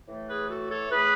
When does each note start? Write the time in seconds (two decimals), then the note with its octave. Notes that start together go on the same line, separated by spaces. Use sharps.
0.07 A2 E3 A3
0.27 G#4 B4
0.48 F#4 A4
0.69 A4 C#5
0.89 A2 E3 A3 G#4 B4